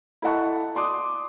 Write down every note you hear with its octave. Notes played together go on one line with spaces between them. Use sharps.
E4 A4 D#5 F#5 A5 C#6
D5 C6 D6 D#6